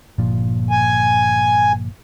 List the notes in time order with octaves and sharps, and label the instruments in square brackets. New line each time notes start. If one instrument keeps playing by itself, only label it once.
[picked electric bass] G1 A#2 F3
[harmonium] G#5